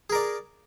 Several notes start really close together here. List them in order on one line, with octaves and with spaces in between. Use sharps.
G#4 A#4 D5